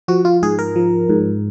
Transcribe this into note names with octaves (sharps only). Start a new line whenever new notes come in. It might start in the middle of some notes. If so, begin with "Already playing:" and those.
F3 F#4
F4
G#2 G#4
A#4
F3
G#2